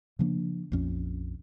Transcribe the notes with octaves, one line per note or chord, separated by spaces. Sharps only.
C#3 F3 A#3 D4
A#1 F2 C#4